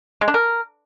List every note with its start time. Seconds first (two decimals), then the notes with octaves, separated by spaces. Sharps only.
0.21 G#3
0.28 D4
0.34 A#4